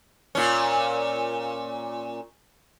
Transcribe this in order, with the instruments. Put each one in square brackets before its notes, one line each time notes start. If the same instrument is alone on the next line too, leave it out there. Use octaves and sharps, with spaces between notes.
[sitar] A#2 C#4